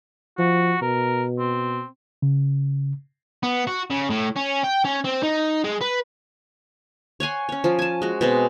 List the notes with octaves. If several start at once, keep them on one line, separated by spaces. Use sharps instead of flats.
F3 F#4
B2 A#4
C4
C#3
B3
F#4
C#3
A2
C#4
G5
C#4
C4
D#4
G#3
B4
C#5 F#5 G#5 C6
C#4 C#5
F3 F4
G#5 A5
G#3 F#4
B2 G#3 C4